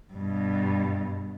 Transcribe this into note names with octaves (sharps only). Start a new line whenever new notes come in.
G2 B2